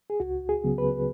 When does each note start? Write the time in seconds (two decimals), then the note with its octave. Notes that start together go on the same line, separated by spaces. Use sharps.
0.10 G#4
0.20 C#2 F#4
0.49 G#4
0.64 C#3 F#3 B3
0.78 B4